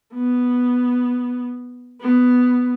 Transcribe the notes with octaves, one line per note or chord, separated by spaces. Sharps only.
B3
B3